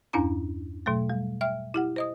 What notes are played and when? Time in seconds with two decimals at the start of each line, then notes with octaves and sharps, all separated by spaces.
0.13 E2 G2 C#4 D4 E4 A#5
0.86 B2 F#3 A3
1.10 G3
1.41 E5 G5 F6
1.74 E4 G4 F#5
1.96 C5 D#5 D#6